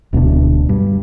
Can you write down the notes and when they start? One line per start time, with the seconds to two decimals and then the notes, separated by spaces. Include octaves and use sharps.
0.13 D1 D2 B2 D4
0.69 G2